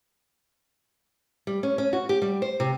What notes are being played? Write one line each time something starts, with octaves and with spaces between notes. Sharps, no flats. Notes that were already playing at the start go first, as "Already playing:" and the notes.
G3
C#4
C#4
F#4
G4
G3
C5
C3